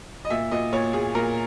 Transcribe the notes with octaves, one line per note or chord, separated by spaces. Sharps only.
D#5
A#2 E5
A#2 D#5
A#2 C#5
A#2 G#4
A#2 A#4